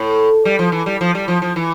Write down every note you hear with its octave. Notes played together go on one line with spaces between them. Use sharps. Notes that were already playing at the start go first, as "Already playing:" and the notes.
Already playing: A2
G3
F3
E3
G3
F3
G3
F3
F3
E3